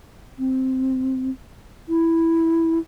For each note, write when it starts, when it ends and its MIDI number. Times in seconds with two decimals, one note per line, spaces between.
0.39 1.30 60
1.89 2.78 64